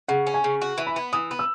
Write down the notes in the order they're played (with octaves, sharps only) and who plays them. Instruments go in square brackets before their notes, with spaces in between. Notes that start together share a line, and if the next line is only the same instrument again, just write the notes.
[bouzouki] C#3 [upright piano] F#5
[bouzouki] C#4
[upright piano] G#5
[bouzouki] C#3
F#4
E3
[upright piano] B5
[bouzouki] B3
[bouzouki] E3 [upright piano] D#6
[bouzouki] B3
[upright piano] E6